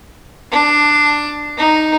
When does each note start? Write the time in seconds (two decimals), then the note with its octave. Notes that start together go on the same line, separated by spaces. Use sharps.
0.52 D4
1.58 D#4